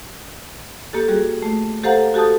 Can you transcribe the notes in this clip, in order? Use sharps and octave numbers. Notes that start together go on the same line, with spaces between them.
A#3 G4 A4
G3 F#4 G#4
A3
G4 A4 C5 F5 F#5 A#5
F#4 G4 A4 A5 D#6